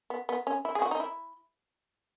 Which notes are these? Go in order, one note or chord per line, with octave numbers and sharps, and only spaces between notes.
B3
B3
C#4
E4
G#4
F#4
D#4
E4